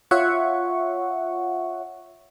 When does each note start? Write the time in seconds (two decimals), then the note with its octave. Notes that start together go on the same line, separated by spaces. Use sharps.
0.11 F4 C#5 E5 F#5 C#6